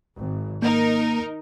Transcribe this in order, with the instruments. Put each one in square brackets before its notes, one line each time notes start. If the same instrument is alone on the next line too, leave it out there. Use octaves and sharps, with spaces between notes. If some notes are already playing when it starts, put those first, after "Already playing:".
[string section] G#1
[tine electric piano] A#3 [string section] D#4 A#4